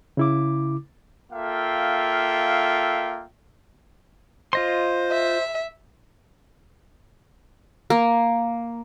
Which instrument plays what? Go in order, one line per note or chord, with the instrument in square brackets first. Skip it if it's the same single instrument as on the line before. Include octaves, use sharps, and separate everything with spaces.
[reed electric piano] C#3 E4 D6
[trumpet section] A#3 F4 A4 E5 F5 G5
[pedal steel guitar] F4 D#5 C6 [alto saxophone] C5
[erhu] E5
[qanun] A#3